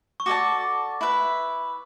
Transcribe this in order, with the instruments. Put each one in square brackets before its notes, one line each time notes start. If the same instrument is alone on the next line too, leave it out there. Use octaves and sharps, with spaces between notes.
[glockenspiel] C#6
[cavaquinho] F#4 A4 D5 A5 [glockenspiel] D6
[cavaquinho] E4 B4 E5